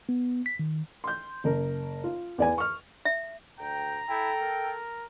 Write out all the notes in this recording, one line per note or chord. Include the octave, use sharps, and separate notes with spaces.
B3
B6
D#3
C6 G6
F#1 A#4
F4
E2 D5 G#5
C#6 F6
E5
D2 G5 A#5
E4 A4 G5
A#4